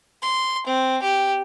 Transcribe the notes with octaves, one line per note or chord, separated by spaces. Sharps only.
C6
C4
G4